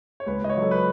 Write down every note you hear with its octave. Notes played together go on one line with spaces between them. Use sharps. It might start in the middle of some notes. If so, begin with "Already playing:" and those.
C#5
C#2 B4
C#2 D#5
C#5
F#3 A4
B4